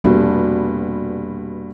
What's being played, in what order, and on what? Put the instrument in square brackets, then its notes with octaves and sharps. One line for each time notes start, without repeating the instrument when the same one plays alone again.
[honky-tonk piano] F1 B2 [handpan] G3 A#3 D4